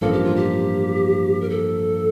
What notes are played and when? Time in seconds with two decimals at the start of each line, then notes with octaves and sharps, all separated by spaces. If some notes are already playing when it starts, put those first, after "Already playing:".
0.01 A1 G2 F3 A#3 A4
0.13 G4
0.24 F4
0.36 G4
1.41 A#4
1.50 A4